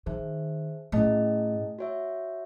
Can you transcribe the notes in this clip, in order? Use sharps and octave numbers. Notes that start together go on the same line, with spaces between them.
D#3 G#4 C5 E5 A5
A2 C#4 E4 G#4 D#5 A5
F#4 C#5 E5